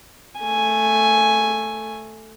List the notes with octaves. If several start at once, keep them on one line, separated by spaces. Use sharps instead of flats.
A3 G#5